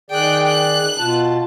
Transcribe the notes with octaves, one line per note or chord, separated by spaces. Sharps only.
D#3 G#4 D5 G5 F#6
F#6
B2 F4 A5